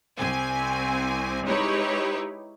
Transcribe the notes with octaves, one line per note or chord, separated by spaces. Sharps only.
C2 C4 G#5
G#3 D#4 E4 G4 B4 C#5